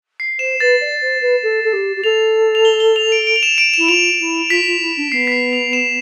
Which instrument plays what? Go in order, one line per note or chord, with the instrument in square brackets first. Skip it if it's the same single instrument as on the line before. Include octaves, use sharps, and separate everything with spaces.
[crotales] C7
[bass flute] C5 [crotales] E7
[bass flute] B4 [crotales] A6
[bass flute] D5
C5
B4
A4
A4
G4
G4
[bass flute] A4 [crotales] F7
[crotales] F7
G7
G7
F7
D7
D7
F7
E7
D7
[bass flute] E4 [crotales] E7
[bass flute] F4 [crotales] F7
[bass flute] E4
[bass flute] F4 [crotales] B6
[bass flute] F4
E4
D4
[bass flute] B3 [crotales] C7
[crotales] B6
C7
F7
E7